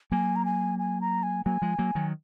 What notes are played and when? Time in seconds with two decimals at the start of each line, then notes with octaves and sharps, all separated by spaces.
0.12 F#3 A#3 G#5
0.36 A#5
0.45 G#5
0.79 G#5
1.01 A#5
1.23 G#5
1.45 F#3 A#3 G#5
1.62 F3 G#3
1.78 F#3 A#3
1.95 D#3 F#3